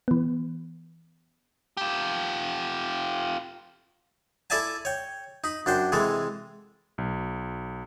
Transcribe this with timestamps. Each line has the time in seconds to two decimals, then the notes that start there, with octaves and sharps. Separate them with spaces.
0.08 E3 B3
1.77 F4 G4
4.50 E4 A4 D5 E5 G#5 A5
4.85 C#5 G5
5.44 D#4 B5
5.66 F#2 D4 C5 G5
5.92 C3 E3 G#3 A4
6.98 B1